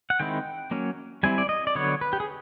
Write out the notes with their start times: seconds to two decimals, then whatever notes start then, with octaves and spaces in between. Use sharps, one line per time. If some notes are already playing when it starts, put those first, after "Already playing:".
0.10 F#5
0.20 D#3 G#3 C4 E4 G5
0.71 F#3 A#3 C#4
1.23 G3 C4 E4 G#5
1.38 D5
1.49 D#5
1.67 D5
1.75 D3 F#3 B3 C#5
2.01 B4
2.13 G4
2.20 G#4